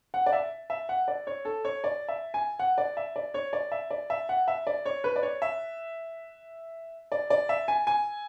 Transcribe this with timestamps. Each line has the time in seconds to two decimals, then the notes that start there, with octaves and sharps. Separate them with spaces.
0.14 F#5
0.26 D5
0.33 E5
0.70 E5
0.89 F#5
1.08 D5
1.27 C#5
1.45 A4
1.65 C#5
1.84 D5
2.08 E5
2.34 G#5
2.59 F#5
2.78 D5
2.97 E5
3.16 D5
3.34 C#5
3.53 D5
3.72 E5
3.91 D5
4.10 E5
4.29 F#5
4.48 E5
4.67 D5
4.86 C#5
5.04 B4
5.16 D5
5.23 C#5
5.42 E5
7.12 D5
7.30 D5
7.49 E5
7.68 G#5
7.87 G#5